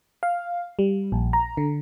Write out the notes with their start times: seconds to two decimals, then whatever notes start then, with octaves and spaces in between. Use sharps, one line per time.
0.23 F5
0.79 G3
1.12 A#1
1.33 A#5
1.57 D3